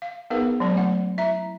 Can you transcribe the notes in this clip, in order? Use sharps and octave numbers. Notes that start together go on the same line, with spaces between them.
F5
B3 D#4 G#4 A#4 B4 F5
F#3 G#3 D4 D5
A3 C#4 F#5
E4 E5 A#5